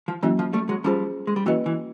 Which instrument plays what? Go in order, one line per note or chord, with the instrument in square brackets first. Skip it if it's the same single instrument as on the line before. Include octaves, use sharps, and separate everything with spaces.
[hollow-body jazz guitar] F3
[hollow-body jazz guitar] E3 [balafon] F#3 A#3 C#4 F#4
[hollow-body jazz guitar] F3
G3 A3
F#3 G#3
[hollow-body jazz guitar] F3 G3 [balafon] C#4 F4 G#4 C5
[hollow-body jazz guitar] G#3
G3
[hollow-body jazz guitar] E3 F#3 [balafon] A#3 C#4 F#4 B4 D#5
[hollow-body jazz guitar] E3